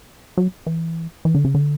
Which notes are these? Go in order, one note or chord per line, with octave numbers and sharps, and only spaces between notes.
F#3
E3
E3
D3
C#3
D3